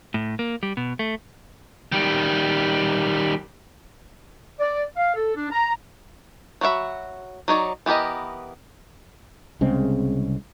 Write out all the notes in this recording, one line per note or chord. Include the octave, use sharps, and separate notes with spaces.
A2
A#3
G3
B2
A3
D#3 G3
D5
F5
A4
D4
A#5
F#3 A#3 F#4 E5 B5
F#3 D#4 C#5 D5
E3 B3 G4 A#4 D#5
C2 C#3 G#3 C4